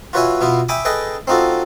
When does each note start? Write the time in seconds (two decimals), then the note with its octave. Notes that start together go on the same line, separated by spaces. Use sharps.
0.13 F4 F#4 B4 C#5 E5 G#5
0.41 B2 B3 E4 F4
0.69 E5 G5 G#5 B5 D6 D#6
0.85 G#4 A4 B4 D#5 G5
1.27 C4 D#4 F4 F#4 A4